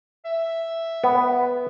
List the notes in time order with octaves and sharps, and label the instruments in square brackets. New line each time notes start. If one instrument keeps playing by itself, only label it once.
[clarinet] E5
[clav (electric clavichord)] B3